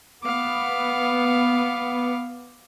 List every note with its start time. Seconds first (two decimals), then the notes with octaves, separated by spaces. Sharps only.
0.23 B3 F5 D6